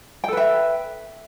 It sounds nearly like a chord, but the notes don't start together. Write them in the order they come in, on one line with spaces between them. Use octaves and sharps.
G5 A4 B4 E5